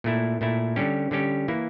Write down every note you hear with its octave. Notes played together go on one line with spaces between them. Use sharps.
A#2 A3 E4
A#2 A3 E4
D3 G3 C#4 G4
D3 G3 C#4 G4
E3 A#3 E4